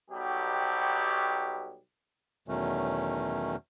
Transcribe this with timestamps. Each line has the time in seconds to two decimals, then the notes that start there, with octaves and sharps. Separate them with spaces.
0.11 B1 B2 F#3 G3 G4
2.48 E2 B2 D#3 F#3 A3 C#4